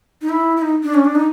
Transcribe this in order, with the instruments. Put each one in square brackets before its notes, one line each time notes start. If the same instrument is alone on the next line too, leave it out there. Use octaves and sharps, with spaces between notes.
[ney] D#4
E4
E4
D#4
D4
C#4
D4
D#4